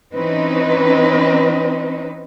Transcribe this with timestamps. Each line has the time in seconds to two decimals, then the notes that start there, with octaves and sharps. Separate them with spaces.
0.14 E3 C4 C#4 D#4 B4